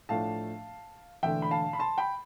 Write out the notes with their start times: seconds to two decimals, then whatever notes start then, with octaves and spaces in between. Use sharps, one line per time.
0.09 A2 F3 A3 D4 F5 A5
1.23 E1 E2 D3 A3 E5 G5
1.42 B5
1.51 F5 A5
1.73 B5
1.79 A5 C6
1.98 G5 B5